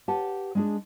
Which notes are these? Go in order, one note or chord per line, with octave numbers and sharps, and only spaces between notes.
G4 B4 F#5 A5
G#3 D4 G#4